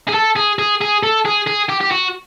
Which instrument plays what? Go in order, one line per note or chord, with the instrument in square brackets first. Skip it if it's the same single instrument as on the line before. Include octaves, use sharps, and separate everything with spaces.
[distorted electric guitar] G#4
A4
G#4
G#4
G#4
A4
G#4
G#4
G4
G4
F#4